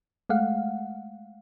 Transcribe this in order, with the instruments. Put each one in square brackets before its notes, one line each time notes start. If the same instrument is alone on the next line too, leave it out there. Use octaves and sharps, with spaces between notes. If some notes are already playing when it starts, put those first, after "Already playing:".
[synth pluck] G#3 A3 F5 F#5